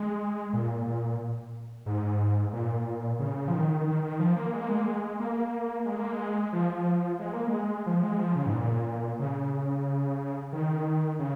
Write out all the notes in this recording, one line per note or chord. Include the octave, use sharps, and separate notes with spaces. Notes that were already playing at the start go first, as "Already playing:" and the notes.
Already playing: G#3
A#2
A#2
G#2
A#2
C#3
F3
D#3
D#3
D#3
F3
A#3
G#3
A#3
G#3
A#3
G#3
A#3
G#3
A#3
G#3
F3
G#3
A#3
G#3
F3
G#3
F3
C#3
G#2
A#2
C#3
D#3
C#3